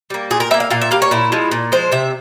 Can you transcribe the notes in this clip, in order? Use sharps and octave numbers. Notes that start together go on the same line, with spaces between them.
G3 A#3
A#2 G#4
A#4
G3 A#3 E5
F5
A#2 F5
E5
G3 A#3 F5
C#5
A#2 E4
F3 G#3
A#2
F3 G#3 C5
C3 E5